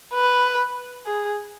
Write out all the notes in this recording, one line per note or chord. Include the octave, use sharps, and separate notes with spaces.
B4
G#4